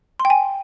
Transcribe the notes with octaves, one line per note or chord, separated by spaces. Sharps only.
C6
G5
G#5